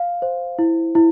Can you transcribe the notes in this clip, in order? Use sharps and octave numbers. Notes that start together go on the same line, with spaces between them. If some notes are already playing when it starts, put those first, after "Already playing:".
Already playing: F5
C5
E4
E4